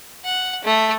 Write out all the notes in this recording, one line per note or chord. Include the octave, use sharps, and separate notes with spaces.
F#5
A3